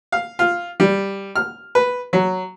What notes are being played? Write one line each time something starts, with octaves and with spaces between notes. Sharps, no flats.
F5
F4
G3
F6
B4
F#3